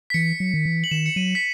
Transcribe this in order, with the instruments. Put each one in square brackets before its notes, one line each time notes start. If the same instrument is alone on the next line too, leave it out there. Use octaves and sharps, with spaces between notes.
[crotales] B6
[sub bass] E3 [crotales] C#7
[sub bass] F#3
D#3
E3
[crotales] F#7
[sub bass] D#3 [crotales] E7
[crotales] C#7
[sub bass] F#3 [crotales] D#7
[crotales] B6